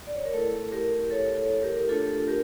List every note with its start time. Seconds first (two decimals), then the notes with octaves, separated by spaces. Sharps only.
0.07 D5
0.16 C#5
0.25 A#4
0.34 A3 E4 A4
0.72 G4 A#4
1.11 A4 C#5
1.37 A4 C#5
1.63 G4 A#4
1.89 A3 D4 F4 A4
2.28 G4 A#4